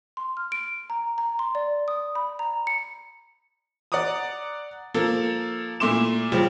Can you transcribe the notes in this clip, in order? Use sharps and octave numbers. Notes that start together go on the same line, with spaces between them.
C6
F6
D7
A#5
A#5
C6
D5
D#6
B5
A#5
C#7
D5 F#5 A#5 D6 D#6
F3 A#3 A4
A#2 A3 E4 C6 D6 E7
C#3 F3 G3